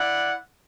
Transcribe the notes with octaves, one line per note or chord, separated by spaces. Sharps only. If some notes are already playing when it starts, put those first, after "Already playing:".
Already playing: E4 D5 F#5